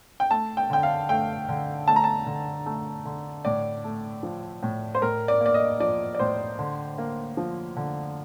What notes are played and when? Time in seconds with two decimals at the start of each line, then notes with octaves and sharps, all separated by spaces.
0.20 G5
0.30 A3 A5
0.57 G5
0.70 D3 G5
0.83 F5
1.09 A3 G5
1.49 D3
1.88 A3 A5
1.96 A#5
2.04 A5
2.26 D3
2.66 A3
3.05 D3
3.45 A2 D5
3.84 A3
4.23 F3
4.63 A2
4.95 C5
5.02 A2 A#4
5.28 D5
5.41 A#3 D5
5.54 D#5
5.80 F3 D5
6.15 D5
6.19 A2 C5
6.59 D3
6.98 A#3
7.37 F3
7.77 D3